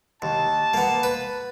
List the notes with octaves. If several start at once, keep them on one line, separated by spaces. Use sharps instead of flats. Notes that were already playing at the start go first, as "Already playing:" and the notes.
D#2 A5
A#3 B3
B4